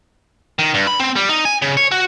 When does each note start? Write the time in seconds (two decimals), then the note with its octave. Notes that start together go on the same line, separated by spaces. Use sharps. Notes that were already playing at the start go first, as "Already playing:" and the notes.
0.59 D#3
0.74 G2
0.87 B5
1.00 C4
1.16 G3
1.29 D#4
1.45 G#5
1.62 C#3
1.77 C#5
1.91 F#4